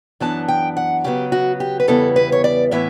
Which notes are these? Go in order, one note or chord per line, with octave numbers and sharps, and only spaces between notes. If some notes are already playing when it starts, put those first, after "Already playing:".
F#2 E3 B3 D4 A5
G5
F#5
C#3 F#3 B3 G4
F#4
G4
B4
E2 C#3 G3 B3 E4 A4
B4
C#5
D5
A2 E3 B3 E4 E5